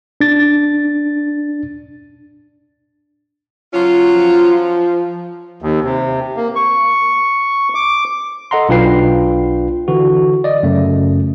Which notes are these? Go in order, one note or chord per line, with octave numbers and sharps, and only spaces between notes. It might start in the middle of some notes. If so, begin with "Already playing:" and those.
D4 A6
F#3 C#4 F4
F3
D#2
C3
A#3
C#6
D6
A4 D#5 F#5 A#5 C6
B1 D4 F4 B4 G5 C7
D3 E3 F#4
D5 D#5
F#2 C#3 A3